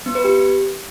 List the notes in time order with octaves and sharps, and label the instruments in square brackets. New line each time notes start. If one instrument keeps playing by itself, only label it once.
[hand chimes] B3
B4
G4